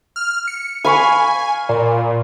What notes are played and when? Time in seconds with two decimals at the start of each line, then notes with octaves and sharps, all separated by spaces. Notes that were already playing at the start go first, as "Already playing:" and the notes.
0.16 F6
0.48 C#7
0.84 F5 G#5 B5 C#6
1.69 A#2